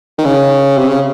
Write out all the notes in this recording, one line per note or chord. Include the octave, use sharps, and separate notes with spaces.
D#3
C#3
C3
C#3